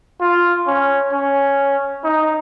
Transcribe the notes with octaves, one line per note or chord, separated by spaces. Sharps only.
F4
C#4
C#4
D#4